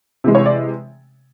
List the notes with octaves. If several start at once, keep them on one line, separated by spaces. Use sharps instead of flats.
C3 E3 G#3
C#5
D5